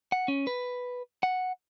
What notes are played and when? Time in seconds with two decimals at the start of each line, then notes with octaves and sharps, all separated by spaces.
0.12 F#5
0.28 C#4
0.47 B4
1.23 F#5